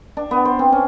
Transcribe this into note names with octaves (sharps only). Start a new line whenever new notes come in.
D4
B3
C5
C4
C#4